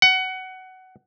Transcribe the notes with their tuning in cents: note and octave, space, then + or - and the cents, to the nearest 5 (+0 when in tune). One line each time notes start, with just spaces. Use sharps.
F#5 +20